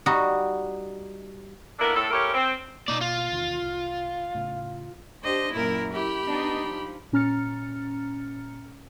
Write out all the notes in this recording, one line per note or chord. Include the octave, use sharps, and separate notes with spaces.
G3 D#4 F#4
A#3 B3 D4 E4 A4 A#4
A2 A4
A3 C#4 E4 G4 A#4 C#5
C4
B2 A#3 D#4 D5
F4
E2 C3 D#3
C2
A2 C#3
D4 G4 C5 D#5
F#2 A#2 E4 A#4
E4 G4 B5
B3 D4 D#4
F3
A#2 C#4 A#5 F6 A6 C#7